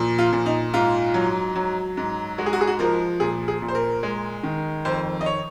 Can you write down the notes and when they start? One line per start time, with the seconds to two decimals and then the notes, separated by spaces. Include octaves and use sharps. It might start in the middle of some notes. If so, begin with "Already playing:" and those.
Already playing: A#2 F3
0.19 F4
0.33 A#2
0.46 D#4
0.73 G#2 F4
1.14 F#3
1.56 F#3
1.97 G#2
2.38 G#3 F#4
2.46 G#4
2.53 F#4
2.61 G#4
2.67 F#4
2.79 F3 A#4
3.20 A#2 G#4
3.48 G#4
3.62 A#2
3.68 C5
3.75 A#4
4.03 G#3
4.43 D#3
4.85 F2 C5
5.21 D#5
5.26 C#5